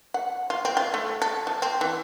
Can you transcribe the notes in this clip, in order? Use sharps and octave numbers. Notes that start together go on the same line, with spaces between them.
F#5
F4
C4
F4
A3
A4
F3
C4
E3